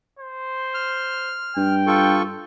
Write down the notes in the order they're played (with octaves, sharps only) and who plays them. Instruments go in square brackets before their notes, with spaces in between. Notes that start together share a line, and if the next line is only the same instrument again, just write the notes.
[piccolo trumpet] C5
[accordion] F6
[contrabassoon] G2 [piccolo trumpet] G5
[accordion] F4 A4 C#6